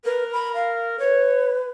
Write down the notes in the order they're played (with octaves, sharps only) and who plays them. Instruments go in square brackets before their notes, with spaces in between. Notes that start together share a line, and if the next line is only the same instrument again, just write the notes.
[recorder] A#4 [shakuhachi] B4
[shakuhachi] B5
F5
[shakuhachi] B4 [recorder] C#5